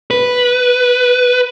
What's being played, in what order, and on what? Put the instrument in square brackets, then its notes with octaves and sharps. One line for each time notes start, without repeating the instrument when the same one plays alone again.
[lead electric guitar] B4